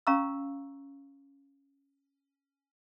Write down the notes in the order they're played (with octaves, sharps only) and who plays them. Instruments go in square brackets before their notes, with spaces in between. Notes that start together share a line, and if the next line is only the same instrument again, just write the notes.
[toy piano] C#4 F5 A#5 C#6 E6